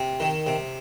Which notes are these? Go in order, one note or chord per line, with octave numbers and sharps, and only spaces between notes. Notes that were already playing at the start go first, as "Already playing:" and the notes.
Already playing: C3
D#3
C3